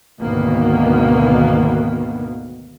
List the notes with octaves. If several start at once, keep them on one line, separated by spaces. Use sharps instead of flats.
G#1 D2 B2 D#3 A#3 B3